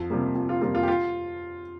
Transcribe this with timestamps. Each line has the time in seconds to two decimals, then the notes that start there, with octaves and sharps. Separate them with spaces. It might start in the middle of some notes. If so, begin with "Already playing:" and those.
Already playing: F2
0.10 C3 G3 A#3
0.35 F2
0.49 F4
0.61 C3 G3 A#3 F4
0.75 F4
0.83 G4
0.88 F4